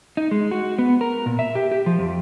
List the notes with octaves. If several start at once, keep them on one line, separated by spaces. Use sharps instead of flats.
D#4
G#3
F#4
B3
A#4
A#2
E5
G4
G4
F3
F2